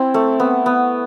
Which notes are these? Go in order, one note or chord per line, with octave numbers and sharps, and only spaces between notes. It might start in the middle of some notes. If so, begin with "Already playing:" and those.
Already playing: C4 E4
A3
B3
B3